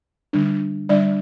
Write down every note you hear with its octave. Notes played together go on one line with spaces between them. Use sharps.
D3 G3 D4
D3 G3 D4 D5